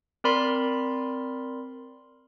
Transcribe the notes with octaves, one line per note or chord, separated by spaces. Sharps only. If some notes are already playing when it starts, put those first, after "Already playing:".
C4 A#4 D5 B5 C6